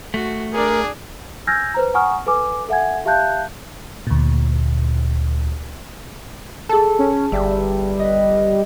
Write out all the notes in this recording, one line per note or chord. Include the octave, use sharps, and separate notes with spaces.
A3 F#4
D4 G#4 A#4 D5
G#5 E6 F6 G6 G#6 A#6
B4 C5 A#5
F#5 G#5 A#5 C#6 D#6 F6
A4 B4 G#5 D6
A4 E5 F#5 G#5 G#6
G4 E5 F5 A5 F#6 G6
D2 A#2
G#4 A4 A5
C#4
G1 G3 E5
B4 D#5